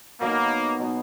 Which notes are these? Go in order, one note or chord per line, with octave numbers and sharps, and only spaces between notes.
B2 F#3 A#3 B3 D#4
B2 F#3 B3 D#4